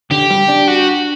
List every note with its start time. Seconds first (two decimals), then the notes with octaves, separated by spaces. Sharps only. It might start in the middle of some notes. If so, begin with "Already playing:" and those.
0.11 D3 G4
0.30 G3
0.48 D4
0.68 F#4